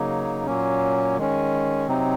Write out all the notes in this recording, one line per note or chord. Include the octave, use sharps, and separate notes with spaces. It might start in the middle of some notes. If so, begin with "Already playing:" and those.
Already playing: C#3 F#3 A#3 D#4
A#2 F#3 A#3 C#4
D#3 G#3 C#4
C3 F#3 C4 D#4